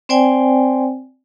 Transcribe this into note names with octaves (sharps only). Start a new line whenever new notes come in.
C4 C5 D5 G5 G#5